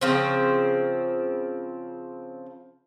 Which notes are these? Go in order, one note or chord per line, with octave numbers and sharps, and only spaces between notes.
C#3 F3 C4